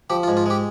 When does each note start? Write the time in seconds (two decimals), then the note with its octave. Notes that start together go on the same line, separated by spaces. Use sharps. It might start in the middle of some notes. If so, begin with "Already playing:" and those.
0.10 F3 G4
0.23 F4
0.28 G#2
0.37 F4
0.46 G#3 G4